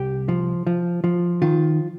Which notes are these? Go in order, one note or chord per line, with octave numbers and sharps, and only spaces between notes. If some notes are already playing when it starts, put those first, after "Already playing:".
Already playing: C2 G4
F3
F3
F3
D#3 F4